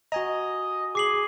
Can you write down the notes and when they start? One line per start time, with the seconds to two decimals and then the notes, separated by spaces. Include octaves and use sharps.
0.12 F#4 D#5 G#5 A#5
0.95 G#4 D6 C7 F#7